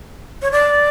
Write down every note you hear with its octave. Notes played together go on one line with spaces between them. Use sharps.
C#5
D5